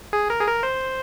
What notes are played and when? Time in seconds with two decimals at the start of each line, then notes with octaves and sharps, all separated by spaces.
0.13 G#4
0.30 A#4
0.40 G#4
0.47 A#4
0.63 C5